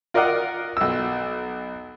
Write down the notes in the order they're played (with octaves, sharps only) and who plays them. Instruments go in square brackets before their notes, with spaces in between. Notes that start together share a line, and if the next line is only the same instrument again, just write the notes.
[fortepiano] F4 A#4 D5 D#5 F5 F#5
B1 E6